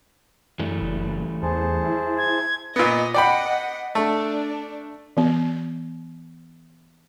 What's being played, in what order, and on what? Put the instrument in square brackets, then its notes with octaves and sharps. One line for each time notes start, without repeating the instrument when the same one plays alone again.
[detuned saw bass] F#2 [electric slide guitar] E3 G3 A3
[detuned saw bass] F#1
[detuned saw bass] E2 [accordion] G#4 C5 A5
[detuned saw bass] E4
[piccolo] G#6
[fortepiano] A#2 B3 [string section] D#5
[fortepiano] D5 G5 B5 [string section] D#5 F#5
[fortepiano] A3 [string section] D4
[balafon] E3 B3